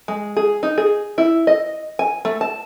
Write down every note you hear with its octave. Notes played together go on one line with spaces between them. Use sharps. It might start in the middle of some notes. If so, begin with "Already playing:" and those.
G#3
G#4
D#4
G#4
E4
D#5
G#5
A3
A5